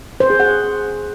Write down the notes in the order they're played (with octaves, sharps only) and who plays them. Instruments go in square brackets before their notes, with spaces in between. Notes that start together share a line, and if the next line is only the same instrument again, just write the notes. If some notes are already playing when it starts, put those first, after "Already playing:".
[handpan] C5
G#4
F#5